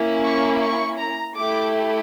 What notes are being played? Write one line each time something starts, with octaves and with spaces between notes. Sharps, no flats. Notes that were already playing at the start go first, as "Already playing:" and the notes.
Already playing: A#3 C#4 E4
C#6
C#6
A#5
A3 E4 G4 D6